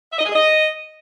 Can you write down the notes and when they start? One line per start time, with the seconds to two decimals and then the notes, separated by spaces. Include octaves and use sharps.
0.12 E5
0.19 D#5
0.25 G#4
0.32 D#5